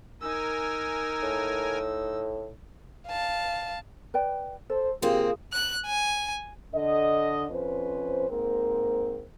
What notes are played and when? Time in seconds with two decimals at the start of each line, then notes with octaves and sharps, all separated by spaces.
0.22 D#4 A#4 G#5 E6
1.23 A2
3.07 F5 A5
4.14 B4 D5 G5
4.70 A4 C5
5.02 C3 A#3 C4 F4 G4 G#4 C#5 F5
5.53 F#6
5.86 G#5
6.74 D3 A4 D#5
7.50 F2 C#4 B4 C5
8.30 G#2 A#3 C4 A#4